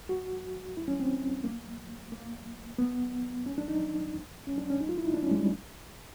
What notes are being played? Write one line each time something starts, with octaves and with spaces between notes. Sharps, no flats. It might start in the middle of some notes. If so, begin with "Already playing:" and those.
F#4
E4
C#4
C4
A#3
A#3
B3
C#4
D4
D#4
C#4
D4
C#4
D#4
F4
E4
D#4
D4
C#4
G#3
G3